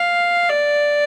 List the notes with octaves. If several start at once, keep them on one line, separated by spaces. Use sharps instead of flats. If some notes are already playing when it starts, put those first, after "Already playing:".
Already playing: F5
D5